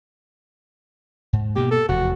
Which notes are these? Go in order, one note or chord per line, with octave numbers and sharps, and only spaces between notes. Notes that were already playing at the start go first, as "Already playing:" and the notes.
G#2
G#2 B2 A#3 G4
A4
F1 E2 F#4